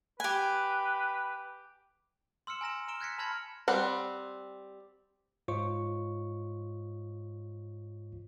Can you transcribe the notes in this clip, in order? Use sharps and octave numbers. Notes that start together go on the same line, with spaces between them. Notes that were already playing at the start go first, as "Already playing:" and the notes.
G4 B4 G#5
C6 E6 F6 C#7 E7
G#5 A#5 A#6 E7
A#5 F6 D7 E7 G7
F#6 G#6 A#6 B6 C#7
A5 B5 C6 F6 G#6 A#6
G3 C4 F#5
G#2 F4 C5 C#5 D#5 C#6